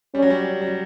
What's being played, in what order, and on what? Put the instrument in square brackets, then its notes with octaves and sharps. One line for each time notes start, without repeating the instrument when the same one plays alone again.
[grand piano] G3 [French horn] C#4
[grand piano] F#3
G3
F#3
G3